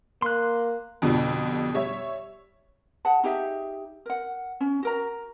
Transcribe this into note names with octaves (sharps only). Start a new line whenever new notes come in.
A#3 C6 F#6
F2 B2 D3 F3 G3
G3 C#5 E5
G#4 F#5 A5
D#4 G4 G#4 E5
A#4 F#5
C#4
F#4 A#4 A#5